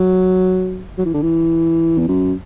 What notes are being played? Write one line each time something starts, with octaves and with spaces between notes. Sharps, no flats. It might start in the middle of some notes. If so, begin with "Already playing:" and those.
Already playing: F#3
F#3
E3
D3
E3
E2
F#2